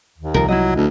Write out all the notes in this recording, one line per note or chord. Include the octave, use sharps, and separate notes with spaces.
D#2
C2 F3 A#4
F#3 E4 D#5
D2